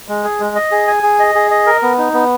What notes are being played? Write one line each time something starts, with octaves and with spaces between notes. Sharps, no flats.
G#3
G#4
G#3
D#5
G#4
G#5
G#4
D#5
G#4
D#5
A#4
B3
D#4
B3